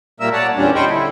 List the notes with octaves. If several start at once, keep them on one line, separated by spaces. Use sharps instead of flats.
A#2 G3 A#3 A#4 E5 E6
C#5 D5 F#5 A5
E2 A#2 G3 C#4 D4
C5 D#5 G5 B5 C#6
D3 E4